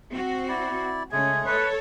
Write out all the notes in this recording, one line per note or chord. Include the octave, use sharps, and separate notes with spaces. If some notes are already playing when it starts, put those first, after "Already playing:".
C4 F#4
E4 D5
C#3 G#3 A3 C#4 G#4 G#5
A4 B4 C#5